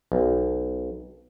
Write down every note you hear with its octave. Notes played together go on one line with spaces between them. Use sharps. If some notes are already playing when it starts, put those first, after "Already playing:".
B1